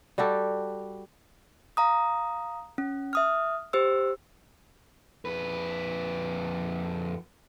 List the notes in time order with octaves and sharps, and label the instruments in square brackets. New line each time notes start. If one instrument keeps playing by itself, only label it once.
[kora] G3 F#4 G4 A4
[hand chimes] F5 A#5 D#6
C#4
E5 D#6 F6
G4 C5 E6
[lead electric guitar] F2 B4